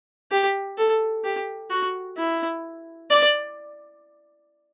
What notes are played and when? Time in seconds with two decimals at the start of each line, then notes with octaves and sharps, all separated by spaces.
0.32 G4
0.78 A4
1.24 G4
1.71 F#4
2.17 E4
3.10 D5